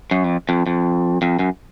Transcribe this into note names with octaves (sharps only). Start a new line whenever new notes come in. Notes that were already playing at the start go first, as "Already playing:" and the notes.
F#2
F2
F2
F2
F2
F#2